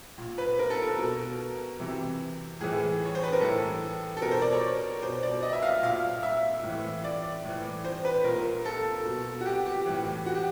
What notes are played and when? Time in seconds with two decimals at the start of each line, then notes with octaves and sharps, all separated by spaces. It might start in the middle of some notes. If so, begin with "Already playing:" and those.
0.18 A#2
0.38 B4
0.59 A#4
0.70 A4
0.82 A#4
0.98 B2
1.80 C3 E3
2.60 A2 E3 G#4
3.05 C#5
3.15 C5
3.23 B4
3.33 A#4
3.41 A2 E3 A4
4.17 A4
4.21 B2 A#4
4.31 C5
4.42 D5
4.52 C#5
5.02 B2 C5
5.23 D5
5.42 D#5
5.53 E5
5.63 F5
5.82 A#2 F5
6.23 E5
6.63 A2 E3
7.04 D5
7.44 A2 E3
7.85 C5
8.05 B4
8.24 A#2 A#4
8.65 A4
9.06 B2
9.41 F#4
9.45 G4
9.66 G4
9.86 A2 E3
10.26 F#4
10.35 G4